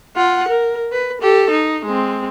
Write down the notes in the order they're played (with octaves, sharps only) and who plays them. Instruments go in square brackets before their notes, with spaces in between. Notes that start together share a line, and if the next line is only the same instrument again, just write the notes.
[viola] F4 F#5
A#4
B4
G4 A4
D#4
G#3 C4